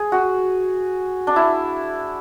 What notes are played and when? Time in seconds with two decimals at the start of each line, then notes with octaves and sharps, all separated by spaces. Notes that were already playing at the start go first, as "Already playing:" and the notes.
Already playing: G#4
0.12 F#4
1.27 D4
1.36 E4